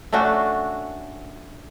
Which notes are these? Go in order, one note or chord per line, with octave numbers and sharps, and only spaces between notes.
A3 C#4 D4 F#4